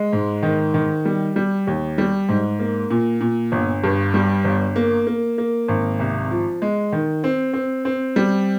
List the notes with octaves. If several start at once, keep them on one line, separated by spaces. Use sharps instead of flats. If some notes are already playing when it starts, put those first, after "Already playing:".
Already playing: G#3
G#2
D#3
D#3
G3
G3
D#2
G3
G#2
A#3
A#2
A#2
G1
G2
G3
G1
A#3
A#3
A#3
G#1
C2
F3
G#3
D#3
C4
C4
C4
G3